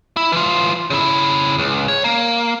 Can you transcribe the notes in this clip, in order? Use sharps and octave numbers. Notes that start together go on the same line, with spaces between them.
E4
E3 F4
C#3 E4
C#2
C#5
A#3